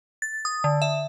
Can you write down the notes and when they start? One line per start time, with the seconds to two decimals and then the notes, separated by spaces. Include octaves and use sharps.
0.22 A6
0.45 D#6
0.64 D3
0.82 E5